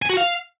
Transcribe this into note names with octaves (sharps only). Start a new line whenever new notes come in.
G#5
F#4
F5